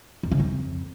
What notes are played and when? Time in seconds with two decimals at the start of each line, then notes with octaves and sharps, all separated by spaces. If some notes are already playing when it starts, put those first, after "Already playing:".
0.23 F2
0.31 C#3
0.40 F2